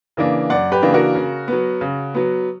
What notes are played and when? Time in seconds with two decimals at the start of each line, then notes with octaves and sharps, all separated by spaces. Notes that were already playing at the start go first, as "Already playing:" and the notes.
0.17 C#3 E3 A#3 D4
0.50 F#2 D5 F#5
0.72 G4 B4
0.82 C#3 E3 A#3 D4
0.94 F#4 A#4
1.15 C#3
1.48 F#3 B3
1.81 C#3
2.14 F#3 B3